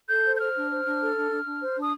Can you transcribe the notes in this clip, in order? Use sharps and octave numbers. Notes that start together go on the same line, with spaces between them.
A4 G6
C5
G6
C5 F6
D4
C5
D4
A4
D4
D4
D4
C5
D4
D#6